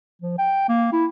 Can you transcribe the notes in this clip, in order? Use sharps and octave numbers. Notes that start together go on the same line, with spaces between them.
F3
G5
A#3
E4